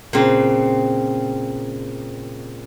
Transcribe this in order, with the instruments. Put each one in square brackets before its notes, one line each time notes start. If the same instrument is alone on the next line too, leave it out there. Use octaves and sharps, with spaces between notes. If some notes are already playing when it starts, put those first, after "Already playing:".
[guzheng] A#2 C#3 C4